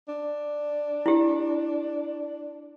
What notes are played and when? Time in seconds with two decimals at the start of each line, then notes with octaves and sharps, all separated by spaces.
0.08 D4
1.06 E4 G4